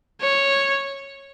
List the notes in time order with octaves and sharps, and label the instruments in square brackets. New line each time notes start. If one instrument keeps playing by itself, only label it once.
[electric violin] C#5